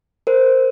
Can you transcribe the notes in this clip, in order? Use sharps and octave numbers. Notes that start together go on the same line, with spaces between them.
A#4 C5